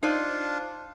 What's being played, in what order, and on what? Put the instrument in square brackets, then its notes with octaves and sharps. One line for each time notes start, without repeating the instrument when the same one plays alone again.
[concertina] D4 F4 [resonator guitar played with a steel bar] D#4 C5 D5